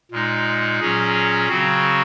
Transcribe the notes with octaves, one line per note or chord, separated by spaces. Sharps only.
A#2 G#3 D#4
A#2 F#3 C#4 G#4
C#3 F#3 C4 F#4